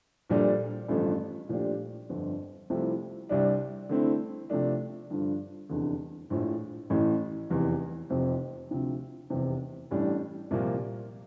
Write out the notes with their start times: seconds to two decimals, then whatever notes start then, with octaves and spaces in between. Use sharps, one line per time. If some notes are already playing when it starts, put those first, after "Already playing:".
0.30 A#1 A#2 G3 D4 A4
0.88 A1 G2 D3 F3 A3
1.49 A#2 F3 A3 D4 G4
2.10 G1 F2 D3
2.70 C2 C3 F3 A3 E4
3.29 C2 C3 G3 D4
3.89 D3 A3 C4 E4
4.50 C3 F3 A3 D4
5.10 G2 D3 F3
5.69 F1 E2 D3
6.30 A#1 A2 F3
6.90 A1 A2 E3
7.50 F1 E2 E3
8.10 F1 F2 C3 F3
8.71 D2 C3 F3 C4
9.30 F1 E2 C3
9.91 A1 A2 G3 D4
10.51 C2 A#2 F3 A#3